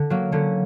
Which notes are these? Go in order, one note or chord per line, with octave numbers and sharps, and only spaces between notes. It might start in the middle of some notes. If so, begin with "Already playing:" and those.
Already playing: D3
F#3 A#3
D3 C#4